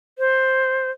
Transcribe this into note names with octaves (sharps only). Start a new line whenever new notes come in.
C5